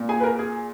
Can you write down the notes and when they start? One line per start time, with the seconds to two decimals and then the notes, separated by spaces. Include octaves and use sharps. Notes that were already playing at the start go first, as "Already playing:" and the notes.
Already playing: A#2
0.09 G#4 G#5
0.20 B4
0.24 A#4
0.39 G#4